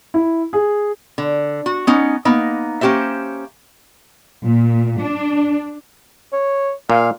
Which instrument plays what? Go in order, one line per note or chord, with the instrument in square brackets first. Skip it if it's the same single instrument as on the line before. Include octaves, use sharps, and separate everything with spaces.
[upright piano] E4
G#4
[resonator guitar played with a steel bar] D3
F#4
B3 C#4 D#4
A#3 B3 D#4
A#3 C#4 G4 C5 E5
[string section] A#2
D4
[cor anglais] C#5
[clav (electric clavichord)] A#2 [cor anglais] F5